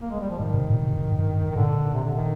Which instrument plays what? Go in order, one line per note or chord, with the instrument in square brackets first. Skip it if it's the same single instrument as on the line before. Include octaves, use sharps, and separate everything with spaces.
[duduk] A#3
G#3
G3
F3
[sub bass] G#2 [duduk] D#3
[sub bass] C3
G#2
A#2
C3
G2
G#2
G2
G2
G#2
[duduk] D#3
[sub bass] A#2 [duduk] D3
[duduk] C3
D3
D#3